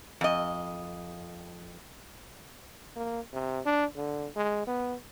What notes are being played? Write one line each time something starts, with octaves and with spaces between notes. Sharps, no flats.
F2 D#5
A#3
C3
D4
D3
G#3
B3